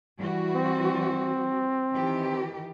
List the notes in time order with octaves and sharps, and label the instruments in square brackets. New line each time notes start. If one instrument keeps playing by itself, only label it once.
[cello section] E3 G3 F#4
[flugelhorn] C4
[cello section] D#3 E3 G4